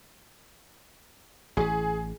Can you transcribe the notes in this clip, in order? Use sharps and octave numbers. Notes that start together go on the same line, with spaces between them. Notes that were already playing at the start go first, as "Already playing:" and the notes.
A1 E3 G#4